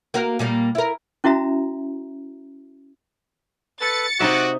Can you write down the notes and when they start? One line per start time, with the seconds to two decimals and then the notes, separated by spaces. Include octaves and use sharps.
0.14 A#3 F#4 A#4
0.39 A#2 G3 A#3
0.75 E4 A#4
1.24 C#4 E4 F#4 E5 A#5
3.81 A4 B4 A6 C#7
4.20 C3 D#4 F#4 D#5 E5 D6 F#6